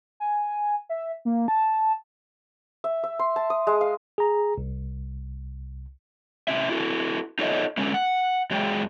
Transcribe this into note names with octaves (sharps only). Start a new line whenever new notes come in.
G#5
E5
A#3
A5
E5
E5
C6
A5
D#6
G#3
F5
G#4 A#5
C2
A2 C3 C#4 E4 E5
E4 F#4 A4
D#4 F4 A4 C#5 D#5 E5
D3 G#3 A3 C#4
F#5
F#2 F#3 G#3 G#4 G5